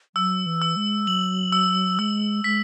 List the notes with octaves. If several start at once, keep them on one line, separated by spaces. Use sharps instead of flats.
F#3 E6
E3
E6
G#3
F#3 F#7
E6
G#3 E6
G#3 B6